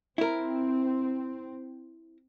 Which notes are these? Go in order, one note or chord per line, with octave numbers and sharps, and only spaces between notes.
C4 E4 A#4